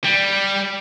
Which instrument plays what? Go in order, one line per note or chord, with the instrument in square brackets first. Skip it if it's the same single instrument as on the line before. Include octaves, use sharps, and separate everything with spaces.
[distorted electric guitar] G3